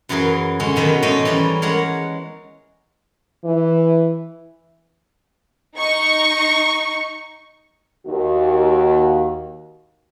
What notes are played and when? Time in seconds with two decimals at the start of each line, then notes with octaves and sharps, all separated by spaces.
0.09 F#2 E3 F#3 G#4 A#4
0.60 D3 G#3 C#4
0.76 B2 D#3 F#3 D#5 E5
1.02 G#2 G#3 A3 C#4 D#4 D#5
1.25 E3 G3 C#4 D5
1.62 G#3 A#4 C#5 F#5
3.45 E3
5.77 D#4 C#6
8.05 D#2 F#4